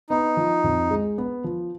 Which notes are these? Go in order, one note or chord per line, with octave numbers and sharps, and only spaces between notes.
B3 D#4
F3
F2
G#3
B3
F3